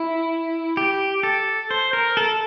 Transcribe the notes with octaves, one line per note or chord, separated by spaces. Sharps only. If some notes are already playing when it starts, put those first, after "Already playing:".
Already playing: E4
G4
A4
C5
A#4
A4